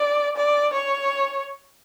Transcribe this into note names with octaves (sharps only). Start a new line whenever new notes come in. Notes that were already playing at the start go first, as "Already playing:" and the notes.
Already playing: D5
D5
C#5